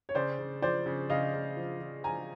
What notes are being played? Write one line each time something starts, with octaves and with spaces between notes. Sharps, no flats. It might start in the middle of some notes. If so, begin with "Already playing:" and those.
C#5
C#3 C5 D5
C#3
F3 C5 D5
C#3
C#3 D#5 F5
C#3
F3
F3
F3 G#5 A#5